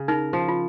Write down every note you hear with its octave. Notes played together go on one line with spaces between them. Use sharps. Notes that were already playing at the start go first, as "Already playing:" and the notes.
Already playing: C#3
D#4 A#4
F3
F4